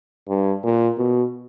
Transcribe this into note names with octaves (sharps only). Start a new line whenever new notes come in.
G2
A#2
B2